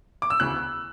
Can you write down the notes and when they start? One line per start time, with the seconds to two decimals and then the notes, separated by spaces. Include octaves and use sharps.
0.22 D6
0.30 E6
0.40 E1 D2 C#3 E3 F#6